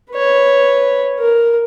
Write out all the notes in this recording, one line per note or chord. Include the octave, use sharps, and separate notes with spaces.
B4 C#5
A#4